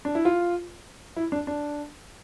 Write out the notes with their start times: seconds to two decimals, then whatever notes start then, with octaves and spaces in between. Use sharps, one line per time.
0.05 D4
0.15 E4
0.25 F4
1.16 E4
1.32 D4
1.47 D4